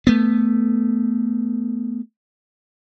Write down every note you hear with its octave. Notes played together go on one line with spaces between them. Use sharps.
A3 B3